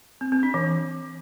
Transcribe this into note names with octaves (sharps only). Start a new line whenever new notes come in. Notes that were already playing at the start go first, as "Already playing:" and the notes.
C4
C4
D4
E3